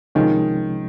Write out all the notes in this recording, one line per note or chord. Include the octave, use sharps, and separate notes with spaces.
C2 C3 D#3 F3 G#3 C#4